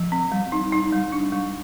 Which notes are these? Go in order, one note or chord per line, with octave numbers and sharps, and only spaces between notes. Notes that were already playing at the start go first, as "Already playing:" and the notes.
Already playing: F3
C4
G3
D#4
D#4
G3
D4
G3